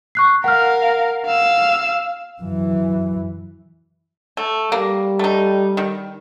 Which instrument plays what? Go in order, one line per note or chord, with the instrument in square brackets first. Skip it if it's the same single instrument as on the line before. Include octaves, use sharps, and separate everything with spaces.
[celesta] C#6 F#6 C7
[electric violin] A#4 F5 [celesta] F#5 F6
[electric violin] F5 E6
[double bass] F#2 E3
[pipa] A3
[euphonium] G3 [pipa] A#3
[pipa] A3 D#4
D#3